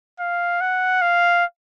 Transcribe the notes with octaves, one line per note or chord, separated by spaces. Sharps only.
F5
F#5
F5